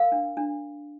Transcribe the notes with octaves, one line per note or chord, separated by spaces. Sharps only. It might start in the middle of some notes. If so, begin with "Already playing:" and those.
Already playing: A#4 F5
D4
D4